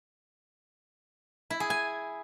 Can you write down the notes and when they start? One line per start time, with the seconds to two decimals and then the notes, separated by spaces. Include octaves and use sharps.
1.50 E4
1.60 G#4
1.70 G#5